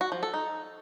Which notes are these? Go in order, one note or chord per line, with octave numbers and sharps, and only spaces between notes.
F#4
F3
A4
D#4